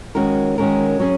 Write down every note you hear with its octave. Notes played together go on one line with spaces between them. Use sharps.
D#3 G#3 C#4 F#4 A#4
D#3 G#3 C#4 F#4 A#4
F#3 C#4 G#4